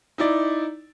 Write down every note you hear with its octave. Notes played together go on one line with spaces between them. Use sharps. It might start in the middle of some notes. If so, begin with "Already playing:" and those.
D#4 E4 D5